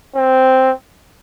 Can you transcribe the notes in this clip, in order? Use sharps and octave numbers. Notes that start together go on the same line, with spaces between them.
C4